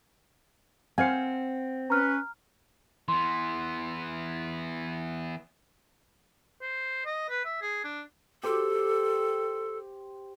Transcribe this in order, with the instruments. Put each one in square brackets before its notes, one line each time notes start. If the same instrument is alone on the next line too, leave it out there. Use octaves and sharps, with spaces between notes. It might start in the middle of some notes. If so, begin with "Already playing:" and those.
[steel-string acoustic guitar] C4 [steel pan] C5 F5 G#5 [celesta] F#5 C#7
[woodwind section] C#4 B4 [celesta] A#5 F6
[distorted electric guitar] E3 B3 [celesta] C6
[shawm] C5
D#5
B4
E5
G#4
D4
[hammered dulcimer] G4 C5 [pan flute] A4